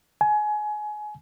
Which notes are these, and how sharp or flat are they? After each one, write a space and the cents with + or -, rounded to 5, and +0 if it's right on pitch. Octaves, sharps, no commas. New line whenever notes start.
G#5 +25